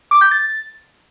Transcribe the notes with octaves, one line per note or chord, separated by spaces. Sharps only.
D6
G6
A6